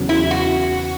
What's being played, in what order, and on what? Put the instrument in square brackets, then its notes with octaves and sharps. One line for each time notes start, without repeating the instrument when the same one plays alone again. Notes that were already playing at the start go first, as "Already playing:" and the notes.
Already playing: [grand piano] E2 C#3 F#3 B3
[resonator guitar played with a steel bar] E4
F#4